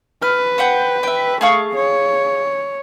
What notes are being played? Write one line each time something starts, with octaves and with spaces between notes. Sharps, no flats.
B4 F6
C5 F#5 G5
E5 G5
A3 G#4 F5 C#6
C#5